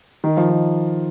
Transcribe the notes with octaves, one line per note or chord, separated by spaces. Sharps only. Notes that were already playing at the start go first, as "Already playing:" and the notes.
D#3
F3
D#3